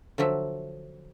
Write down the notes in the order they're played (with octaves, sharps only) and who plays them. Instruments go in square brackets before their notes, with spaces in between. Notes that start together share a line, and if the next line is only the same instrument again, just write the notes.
[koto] D3 F3 F#3 E5